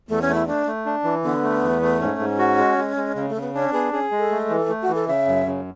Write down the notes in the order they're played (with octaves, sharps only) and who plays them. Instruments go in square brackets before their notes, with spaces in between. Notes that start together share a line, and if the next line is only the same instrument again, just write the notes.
[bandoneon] E2 [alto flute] A3
[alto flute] C#4
[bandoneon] A3
[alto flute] E4
[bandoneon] A3 [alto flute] D4
[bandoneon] A3
D4
E3
[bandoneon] D3 [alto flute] B3
[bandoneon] A3
E2
A3
[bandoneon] G#2 [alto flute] C#4
[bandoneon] G#2
F#4
G#3
G#3
G#3
[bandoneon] C#3 [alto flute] C#4
[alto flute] A3
[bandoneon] C#3
[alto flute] B3
[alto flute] C#4 [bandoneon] D4
[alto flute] B3 [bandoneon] G#4
[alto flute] C#4 [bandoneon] G#4
[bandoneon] G#3
[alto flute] A4
[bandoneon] A3
E3
A3
[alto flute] F#4
[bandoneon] E3
[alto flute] A4
[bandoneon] C#3 [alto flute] E5
[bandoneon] F#2
C#3